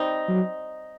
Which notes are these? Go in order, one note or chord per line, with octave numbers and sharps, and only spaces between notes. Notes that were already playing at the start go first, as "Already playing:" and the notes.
Already playing: G3 C4 D#4
F#3